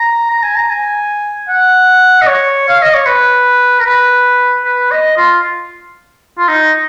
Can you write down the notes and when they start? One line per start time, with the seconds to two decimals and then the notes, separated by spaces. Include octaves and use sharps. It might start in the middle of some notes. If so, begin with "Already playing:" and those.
Already playing: A#5
0.30 A#5
0.43 G#5
0.56 A#5
0.70 G#5
1.49 F#5
2.22 D#5
2.27 C#5
2.69 F5
2.82 D#5
2.94 C#5
3.06 B4
3.79 A#4
3.85 B4
4.65 B4
4.91 D#5
5.17 F4
6.38 F4
6.48 D#4